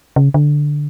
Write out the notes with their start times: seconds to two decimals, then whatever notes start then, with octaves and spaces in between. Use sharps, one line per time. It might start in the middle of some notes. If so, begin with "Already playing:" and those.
0.16 C#3
0.34 D3